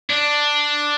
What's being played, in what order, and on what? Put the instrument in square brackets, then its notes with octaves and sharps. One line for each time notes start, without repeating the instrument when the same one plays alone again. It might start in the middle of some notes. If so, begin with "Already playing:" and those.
[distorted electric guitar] D4